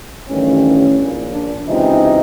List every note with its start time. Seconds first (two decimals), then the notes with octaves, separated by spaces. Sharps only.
0.28 A1 G2 D#3 C#4
0.98 A#1 A#2
1.33 D4
1.68 C#2 C3 E3 D#4